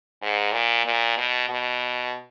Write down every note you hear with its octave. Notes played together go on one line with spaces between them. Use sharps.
G#2
A#2
A#2
B2
B2